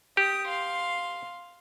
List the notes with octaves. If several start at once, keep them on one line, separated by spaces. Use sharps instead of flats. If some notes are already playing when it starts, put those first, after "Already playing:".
G4 D#6
F5 C6